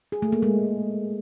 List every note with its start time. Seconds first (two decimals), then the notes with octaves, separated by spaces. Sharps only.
0.12 G#4
0.22 A3
0.32 A#3
0.43 G#3